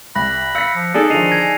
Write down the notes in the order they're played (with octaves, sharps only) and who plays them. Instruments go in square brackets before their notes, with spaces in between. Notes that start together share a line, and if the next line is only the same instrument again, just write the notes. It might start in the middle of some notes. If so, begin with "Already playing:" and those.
[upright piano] C2 [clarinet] B5 [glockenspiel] F#6 A#6
[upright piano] F5 B6 [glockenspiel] E6 G6 C#7
[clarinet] F3
[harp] D#4 G#4 D5 [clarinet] A4 [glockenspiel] A5 A6
[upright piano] D3 D#3 F3 [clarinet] D#5 [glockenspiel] C7 D#7 F7
[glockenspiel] G#5 G#6 A#6